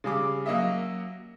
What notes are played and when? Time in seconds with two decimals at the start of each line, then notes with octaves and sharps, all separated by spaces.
0.04 C#3 G3 G#4 D6
0.46 F#3 A#3 C#4 D#5 E5